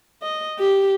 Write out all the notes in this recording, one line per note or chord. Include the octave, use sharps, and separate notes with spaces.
D#5
G4